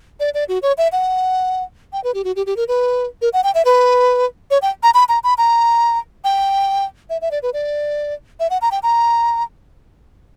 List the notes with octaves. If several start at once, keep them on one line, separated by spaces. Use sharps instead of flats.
D5
D5
F#4
C#5
E5
F#5
G5
B4
G4
F#4
G4
G4
A#4
B4
A#4
F#5
G5
E5
B4
C#5
G5
A#5
B5
A#5
B5
A#5
G5
E5
E5
D5
B4
D5
E5
F#5
A#5
G5
A#5